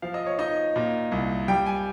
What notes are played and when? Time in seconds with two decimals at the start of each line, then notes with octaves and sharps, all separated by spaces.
0.02 F3 F5
0.14 D#5
0.27 C#5
0.39 D#4 D#5
0.76 A#2
1.12 C2
1.48 G3 G5
1.66 G#5